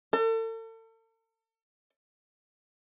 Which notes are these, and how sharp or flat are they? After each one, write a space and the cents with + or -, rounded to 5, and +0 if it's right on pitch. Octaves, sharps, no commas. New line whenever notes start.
A4 +40